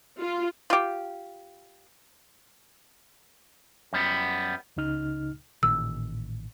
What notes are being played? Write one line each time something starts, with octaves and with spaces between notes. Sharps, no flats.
F4
F4 G4
F#2 G3 B3
C#2 C#3 D#4 F6
A1 A#2 D#3 E6